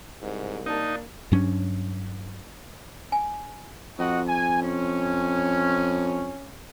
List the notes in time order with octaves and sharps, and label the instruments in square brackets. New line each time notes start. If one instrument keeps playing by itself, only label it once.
[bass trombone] C2 [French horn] G#2
[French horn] A#3 [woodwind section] D4 [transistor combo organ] D#4
[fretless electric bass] G2 F#3 C#4 D4
[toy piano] G#5
[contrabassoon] F2 [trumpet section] F#4 D#5 F#5
[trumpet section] G#5
C#4